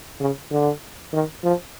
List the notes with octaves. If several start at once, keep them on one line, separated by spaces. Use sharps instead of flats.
C#3
D3
D#3
F3